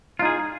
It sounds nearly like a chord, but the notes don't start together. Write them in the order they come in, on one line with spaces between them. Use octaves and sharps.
F4 D#4 G#4